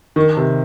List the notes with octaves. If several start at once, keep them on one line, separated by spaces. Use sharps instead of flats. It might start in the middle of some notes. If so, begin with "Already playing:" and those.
D#3
C3